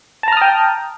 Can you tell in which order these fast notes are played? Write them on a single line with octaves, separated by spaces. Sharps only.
A5 A#5 F6 D#6 G5